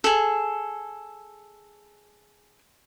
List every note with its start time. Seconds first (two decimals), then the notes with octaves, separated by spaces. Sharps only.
0.04 G#4 A4